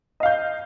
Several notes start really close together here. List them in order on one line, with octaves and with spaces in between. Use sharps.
D#5 F5 G6